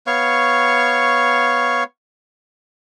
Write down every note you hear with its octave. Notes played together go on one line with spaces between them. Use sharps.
B3 C#5 F5 C#6